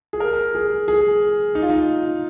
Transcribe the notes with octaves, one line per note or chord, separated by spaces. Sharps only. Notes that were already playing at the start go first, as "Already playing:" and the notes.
G#4
A#4
G#4
G#4
D#4
F4
D#4